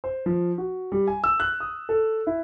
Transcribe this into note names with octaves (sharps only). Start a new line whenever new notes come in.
C5
F3
F#4
G3
G#5
E6
F#6
D#6
A4
E4